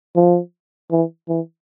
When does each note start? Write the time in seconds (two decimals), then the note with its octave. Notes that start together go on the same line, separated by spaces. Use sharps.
0.16 F3
0.91 E3
1.29 E3